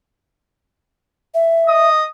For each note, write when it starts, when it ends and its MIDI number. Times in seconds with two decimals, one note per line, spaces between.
1.34 1.89 76
1.67 2.05 75
1.67 2.05 87